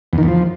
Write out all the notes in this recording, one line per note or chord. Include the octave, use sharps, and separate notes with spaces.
E2
D#3
E2
F3